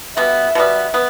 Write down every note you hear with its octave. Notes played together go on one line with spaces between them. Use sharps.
B2 G3 B3 E5
B2 G3 B3
B3